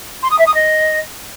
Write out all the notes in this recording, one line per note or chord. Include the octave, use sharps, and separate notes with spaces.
C6
D#6
E5
D#6
D#5